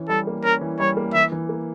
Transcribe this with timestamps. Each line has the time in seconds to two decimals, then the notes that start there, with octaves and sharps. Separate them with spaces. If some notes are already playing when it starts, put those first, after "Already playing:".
Already playing: E3 C#4
0.09 G3 A4
0.27 A#3
0.44 C#4 A#4
0.61 E3
0.80 G3 C#5
0.97 A#3
1.14 E3 E5
1.32 E3
1.49 A#3